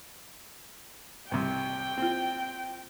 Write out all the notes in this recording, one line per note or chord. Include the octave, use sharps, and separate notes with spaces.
C2 C3 G5
C4 F4